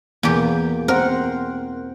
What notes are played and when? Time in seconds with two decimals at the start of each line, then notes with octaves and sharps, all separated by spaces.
0.23 E2 B2 A#3 G4
0.88 C4 A#4 C5 F#5